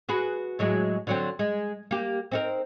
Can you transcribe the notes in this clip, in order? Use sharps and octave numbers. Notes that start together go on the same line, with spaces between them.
F#4 G#4 B4
A2 F#3 G#3
D3 F#3 C4
G#3
A#3 G4
C4 D#4 A#4